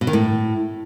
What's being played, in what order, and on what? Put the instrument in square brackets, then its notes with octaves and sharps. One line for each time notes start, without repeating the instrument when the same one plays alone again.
[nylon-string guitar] B2
D#3
A2